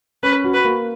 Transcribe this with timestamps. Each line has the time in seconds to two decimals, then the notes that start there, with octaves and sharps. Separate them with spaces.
0.23 C#4 B4
0.44 F#4
0.54 B4
0.65 A#3